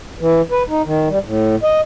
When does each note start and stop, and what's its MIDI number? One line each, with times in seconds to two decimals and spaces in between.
0.21 0.41 52
0.51 0.63 71
0.69 0.82 63
0.85 1.08 51
1.09 1.18 55
1.24 1.56 45
1.63 1.81 75